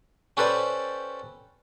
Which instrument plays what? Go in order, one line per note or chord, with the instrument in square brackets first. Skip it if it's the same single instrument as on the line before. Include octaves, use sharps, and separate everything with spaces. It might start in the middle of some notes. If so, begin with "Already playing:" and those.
[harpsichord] C#4 G4 A4 B4 C5 D5